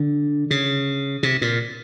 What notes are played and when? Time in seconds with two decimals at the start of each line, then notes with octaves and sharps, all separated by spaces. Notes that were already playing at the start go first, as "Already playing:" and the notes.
Already playing: D3
0.51 C#3
1.23 C3
1.41 A#2